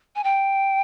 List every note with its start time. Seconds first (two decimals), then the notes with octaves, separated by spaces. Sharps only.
0.16 G#5
0.24 G5